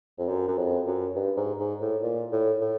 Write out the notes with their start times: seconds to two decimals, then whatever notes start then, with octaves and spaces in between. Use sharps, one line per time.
0.19 F2
0.29 F#2
0.48 F#2
0.58 F2
0.87 F#2
1.16 G2
1.37 G#2
1.59 G#2
1.81 A2
2.02 A#2
2.32 A2
2.61 A2